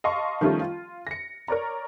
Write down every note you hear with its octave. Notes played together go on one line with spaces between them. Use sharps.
D#5 F5 A5 C6 C#6
D#3 F3 G3 A3 C#4 F4
F4
A#6 C#7
A#4 C#5 D5 A#5